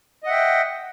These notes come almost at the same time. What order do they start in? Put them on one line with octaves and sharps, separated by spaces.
D#5 F#5 E5 G5